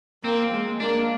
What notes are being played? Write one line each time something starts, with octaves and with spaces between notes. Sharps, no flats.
A#3 C4
G#3
A#3 D4